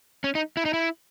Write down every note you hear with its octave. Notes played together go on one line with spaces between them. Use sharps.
C#4
D#4
E4
D#4
E4